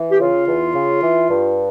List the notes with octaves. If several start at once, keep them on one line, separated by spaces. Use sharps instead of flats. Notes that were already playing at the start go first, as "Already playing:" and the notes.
Already playing: E3
G4
C#3 F4
E2
C#3
E3
G2